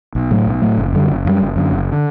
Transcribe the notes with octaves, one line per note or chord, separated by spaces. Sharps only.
B1
A2 F#3 A3
B1
A2 F#3 A3
F#1
F#2 D3 G3
F#1
F#2 D3 G3
F#1
F#2 D3
F#1
D3